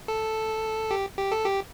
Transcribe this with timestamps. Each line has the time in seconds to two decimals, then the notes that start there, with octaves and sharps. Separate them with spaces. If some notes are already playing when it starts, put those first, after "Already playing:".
0.08 A4
0.91 G4
1.18 G4
1.32 A4
1.45 G4